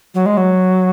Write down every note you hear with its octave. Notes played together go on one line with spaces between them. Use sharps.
F#3
G#3
F#3